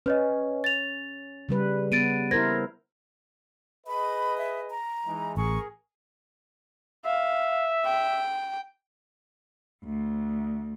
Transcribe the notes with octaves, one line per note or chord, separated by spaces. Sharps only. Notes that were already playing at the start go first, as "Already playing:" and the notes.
C#4 B4 C#5 D#5
A6 F7
C#3 G3 B4
B3 A6 D7 D#7
E4 A#4 C5 G#6 A#6
G#4 B4 D#5 B5
E5
A#5
E3 G#3 D#4
A1 G#4 A#4 C#6
E5 F5
G5
D2